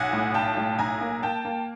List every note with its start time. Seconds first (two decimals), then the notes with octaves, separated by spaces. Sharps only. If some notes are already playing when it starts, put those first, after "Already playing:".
Already playing: B1 F#5 G#5
0.13 A2
0.34 B1 G5 A5
0.57 A2
0.79 B1 G#5 A#5
1.01 A#3
1.23 A#3 G5 A5
1.45 A#3